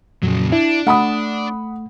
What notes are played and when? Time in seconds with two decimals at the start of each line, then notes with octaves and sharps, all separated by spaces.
0.23 F2 A#2 C#3 F#3
0.52 D4 E4
0.87 A3 F#5 B5 D#6